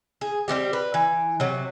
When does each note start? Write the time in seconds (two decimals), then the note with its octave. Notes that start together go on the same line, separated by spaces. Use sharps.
0.21 G#4
0.48 G3 A3 C4 G4
0.73 B4
0.94 E3
1.40 C3 F#3